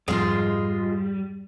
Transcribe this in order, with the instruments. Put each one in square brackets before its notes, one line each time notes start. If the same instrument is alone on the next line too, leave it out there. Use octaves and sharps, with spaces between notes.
[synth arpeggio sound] F2 G#2 [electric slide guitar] G3 [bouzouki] G#3 F4